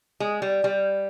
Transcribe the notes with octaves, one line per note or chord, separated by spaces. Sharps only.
G#3
G3
G3